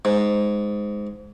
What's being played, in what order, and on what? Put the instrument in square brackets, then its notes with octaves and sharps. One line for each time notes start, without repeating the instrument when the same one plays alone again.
[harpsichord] G#2